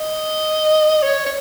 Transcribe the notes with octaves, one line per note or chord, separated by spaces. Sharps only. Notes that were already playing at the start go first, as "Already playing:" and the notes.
Already playing: D#5
C#5
C#5